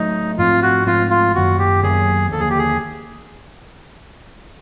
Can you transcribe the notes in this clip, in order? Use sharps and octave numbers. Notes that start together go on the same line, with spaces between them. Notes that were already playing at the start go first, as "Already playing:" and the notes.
Already playing: A2 F#3 A3 D#4
G#2 F3 A3 C4 F4
F#4
G#2 F3 A3 C4 F4
F4
F#2 D#3 F#3 A#3 F#4
G4
F#2 D#3 F#3 A#3 G#4
D#2 D3 F3 A#3 A4
G#4
G4
G#4